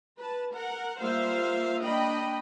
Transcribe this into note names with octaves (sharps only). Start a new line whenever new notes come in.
B4 A5
A#4 F#5
G3 A#3 F4 C5 E5 F5
A#3 D4 D#5 G5 B5